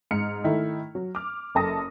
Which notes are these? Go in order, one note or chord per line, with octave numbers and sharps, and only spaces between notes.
G#2 F6 C#7
D#3 A3 D#4 E4
F#3
D6 F6
F#1 F#2 A4 A5 D#6 A#6